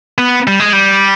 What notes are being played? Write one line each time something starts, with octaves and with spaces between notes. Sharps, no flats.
B3
G3
G#3
G3